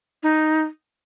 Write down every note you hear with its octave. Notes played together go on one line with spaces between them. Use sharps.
D#4